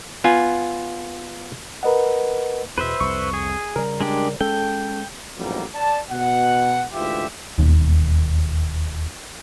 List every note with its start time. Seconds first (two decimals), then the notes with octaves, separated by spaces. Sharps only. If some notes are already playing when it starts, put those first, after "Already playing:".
0.24 B3 F4 G#5
1.83 A#4 B4 D#5 F#5
2.78 E2 B2 B4 C5 E5
3.00 C2 F2 C#6
3.34 G#4
3.76 C#3 G3 A#4
4.01 G#3 D4 G4
4.41 G#3 C#4 A4 G5
5.37 A1 F2 G#2 F#3 G3 A#3
5.74 D5 A5
6.11 B2 F#5
6.93 D2 G#2 E3 F4 G4 E5
7.58 E1 D#2